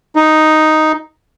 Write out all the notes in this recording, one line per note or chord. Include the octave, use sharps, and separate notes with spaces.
D#4